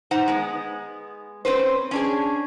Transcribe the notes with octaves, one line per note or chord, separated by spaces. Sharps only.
D#4 C5 F#5 A#5
G#3 B3
C4 C#4 B4 C5
C#4 D4 G#4